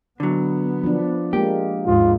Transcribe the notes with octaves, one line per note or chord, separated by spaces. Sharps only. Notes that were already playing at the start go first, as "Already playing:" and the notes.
D3 F#3 B3
F3 D4
G#3 A#3 G4
D#2 G#2 F4